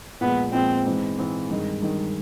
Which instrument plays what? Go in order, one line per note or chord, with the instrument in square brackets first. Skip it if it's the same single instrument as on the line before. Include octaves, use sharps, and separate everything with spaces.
[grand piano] A#2 F3 G#3 [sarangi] B3
[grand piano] A#2 F3 G#3 [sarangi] C4
[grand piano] G#2 E3 G#3 C4
G#2 E3 G#3 C4
G2 D#3 G#3
G2 D#3 G#3